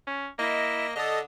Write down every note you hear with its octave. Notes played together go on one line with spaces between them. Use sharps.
C#4
A#3 E4 D#5
D3 A4 D#5 D#6